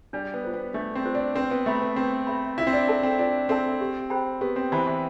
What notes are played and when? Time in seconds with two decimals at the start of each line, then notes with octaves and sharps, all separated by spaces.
0.13 G3 D4
0.34 B3
0.44 F4 C5
0.54 B3
0.74 A3 D4
0.95 C4
1.05 F4 C5
1.15 D4
1.35 C4 B4
1.51 B3
1.66 A3 E5 B5
1.81 B3
1.96 C4 B4
2.27 E5 B5
2.58 E4 F4
2.67 C4
2.73 D4
2.88 A4 E5 A5
3.03 C4
3.19 D4 F4
3.49 C4 A4 E5 A5
3.81 G4
4.10 C5 G5 B5
4.41 B3 G4
4.56 C4
4.72 E3 C5 G5 B5
4.87 E3